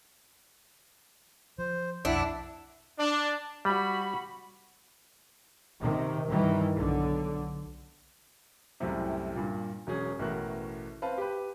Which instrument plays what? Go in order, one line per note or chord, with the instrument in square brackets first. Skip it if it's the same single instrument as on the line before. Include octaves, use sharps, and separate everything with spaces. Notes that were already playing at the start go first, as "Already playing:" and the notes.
[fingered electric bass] F3 [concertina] C5
[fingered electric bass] B1 F2 [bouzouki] D4 [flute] E4 [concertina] E5 F#5
[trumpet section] D4
[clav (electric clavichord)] G3 [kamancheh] F#4 B5
[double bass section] C3 D#3
G2 D#3 E3 G3
B1 D3
[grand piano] C2 F#2 A2 C3
G2 A#2
E1 F#3 C#4 G#4
A1 B2 A3 F#4 A#4 F#6
C4 B4 F5 A5
G4 B4